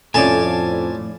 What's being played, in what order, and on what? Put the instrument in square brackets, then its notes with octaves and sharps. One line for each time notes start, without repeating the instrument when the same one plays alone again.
[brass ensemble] F2 [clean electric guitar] A2 D5 [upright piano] A3 C#4 F4 [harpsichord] G#5 A5